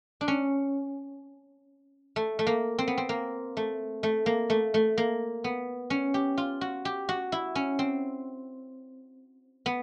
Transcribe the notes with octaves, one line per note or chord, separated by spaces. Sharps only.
D4
C#4
A3
A3
A#3
C4
B3
C4
A#3
A3
A3
A#3
A3
A3
A#3
B3
C#4
G4
F4
F#4
G4
F#4
E4
C#4
C4
B3